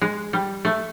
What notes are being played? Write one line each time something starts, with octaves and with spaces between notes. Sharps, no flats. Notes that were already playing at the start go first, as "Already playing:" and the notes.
G#3
G3
A3